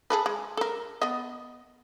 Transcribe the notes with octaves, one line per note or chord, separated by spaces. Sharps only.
G#4 A4 B4
G#3
A4 A#4
B3 D#5